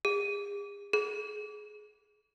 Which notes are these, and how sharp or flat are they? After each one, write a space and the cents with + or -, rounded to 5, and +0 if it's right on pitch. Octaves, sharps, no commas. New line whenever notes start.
G#4 -40
G#4 +20